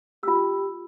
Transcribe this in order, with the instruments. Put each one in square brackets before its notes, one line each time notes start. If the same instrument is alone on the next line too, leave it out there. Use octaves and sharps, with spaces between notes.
[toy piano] F4 E6 [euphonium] G4